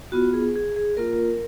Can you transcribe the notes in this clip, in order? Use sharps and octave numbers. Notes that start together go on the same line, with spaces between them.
B3 F4 F#4
G#4
G#4
G#4
A#3 F4 A#4